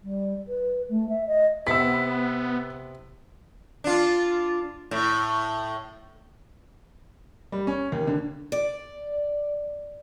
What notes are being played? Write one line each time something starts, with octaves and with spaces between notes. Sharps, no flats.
G3
B4
A3
E5
D#5
C3 B3 E6 B6
D4 F4
A2
G3
C#4
D#2
D3
D5